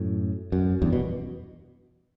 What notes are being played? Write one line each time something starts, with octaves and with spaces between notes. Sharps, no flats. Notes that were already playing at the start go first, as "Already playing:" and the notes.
Already playing: F#2 A2
F#2
E2 G2
B2